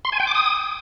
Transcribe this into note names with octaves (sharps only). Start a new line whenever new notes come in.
C6
G#5
G5
D6
D#6